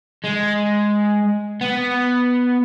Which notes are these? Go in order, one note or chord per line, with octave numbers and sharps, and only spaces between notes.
G#3
B3